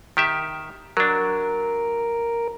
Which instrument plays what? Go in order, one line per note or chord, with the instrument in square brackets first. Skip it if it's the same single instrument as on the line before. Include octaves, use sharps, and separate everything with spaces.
[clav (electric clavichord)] D#3 G4 E5
[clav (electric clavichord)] F#3 D4 [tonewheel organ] A#4